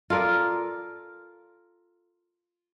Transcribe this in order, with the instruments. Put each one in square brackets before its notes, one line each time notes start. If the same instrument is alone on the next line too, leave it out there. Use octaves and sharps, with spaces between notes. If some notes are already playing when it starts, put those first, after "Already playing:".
[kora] F4 A4 A#4 D5